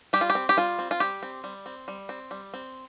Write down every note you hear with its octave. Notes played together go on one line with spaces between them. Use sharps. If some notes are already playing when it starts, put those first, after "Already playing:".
G3 G4
F4
G4
C4
G4
G3 F4
C4
F4
G3 G4
C4
G3
C4
G3
C4
G3
C4